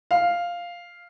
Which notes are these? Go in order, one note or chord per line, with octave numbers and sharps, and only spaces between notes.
F5